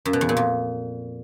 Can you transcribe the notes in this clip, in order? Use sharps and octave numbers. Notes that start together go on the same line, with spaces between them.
F#2
B2
E2
A#2
F2